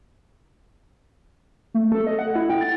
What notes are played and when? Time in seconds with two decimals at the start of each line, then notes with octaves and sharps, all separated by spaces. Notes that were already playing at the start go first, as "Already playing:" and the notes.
1.74 A3
1.92 A4
2.07 D#5
2.19 F#5
2.35 E4
2.50 G5
2.61 A6